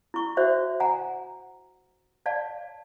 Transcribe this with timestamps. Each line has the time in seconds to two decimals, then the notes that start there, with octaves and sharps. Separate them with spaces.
0.14 E4 C#6
0.37 F#4 C5 C#5 E5
0.80 F#5 G#5 A#5
2.26 C#5 D5 F5 A5